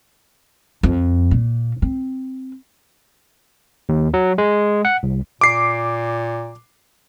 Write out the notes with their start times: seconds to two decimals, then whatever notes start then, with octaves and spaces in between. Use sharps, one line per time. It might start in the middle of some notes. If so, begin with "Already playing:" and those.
0.83 F2
1.31 A#2
1.82 C4
3.89 D#2
4.14 F#3
4.38 G#3
4.85 F#5
5.03 C2
5.41 A#2 D6 C7